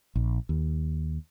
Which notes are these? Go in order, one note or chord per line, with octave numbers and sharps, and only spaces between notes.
A#1
D#2